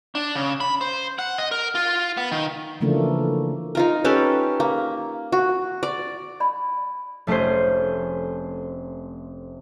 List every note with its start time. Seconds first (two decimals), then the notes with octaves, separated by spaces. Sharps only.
0.15 D4
0.35 C#3
0.60 B5
0.81 C5
1.19 F#5
1.38 D#5
1.51 A#4
1.75 F4
2.17 B3
2.32 D#3
2.81 C#3 E3 F3 A3 A#3 D4
3.75 D#4 F4 A#4
4.05 C#4 G4 A4 B4
4.60 A#3
5.32 F#4
5.83 D5
6.40 D5 B5
7.27 F1 A3 C#4 G#4 C5